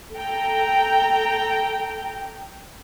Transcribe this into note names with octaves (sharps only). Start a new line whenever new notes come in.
A4 G5 A#5